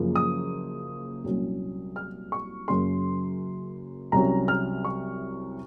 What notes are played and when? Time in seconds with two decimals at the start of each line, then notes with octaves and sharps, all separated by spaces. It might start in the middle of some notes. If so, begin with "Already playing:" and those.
Already playing: F#1 F#2 C#3 F3 A#3
0.16 D#6
1.24 C2 A#2 F#3 C#4
1.96 F6
2.32 C#6
2.68 F#1 F#2 C#3 F#3 C#4 C6
4.12 C2 C3 F#3 C#4 A#5
4.48 F6
4.85 C#6